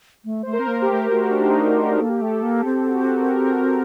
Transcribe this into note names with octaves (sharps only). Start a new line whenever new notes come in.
A3
A3 C5
A#4
C4
A#3
G4
A3
A3 F#4
D4
D#4
G4
A#3 A4
G4
A4
A3
A#3 G4
C4
F#4
G4
F#4
A#4
A#4